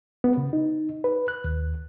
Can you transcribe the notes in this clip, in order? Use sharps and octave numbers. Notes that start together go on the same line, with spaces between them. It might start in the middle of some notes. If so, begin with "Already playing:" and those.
B3
C#3
D#4
B4
F#6
D#2